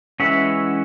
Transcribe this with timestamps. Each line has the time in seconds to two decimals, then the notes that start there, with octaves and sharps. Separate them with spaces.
0.20 E3 G#3 C#4 E5 F#5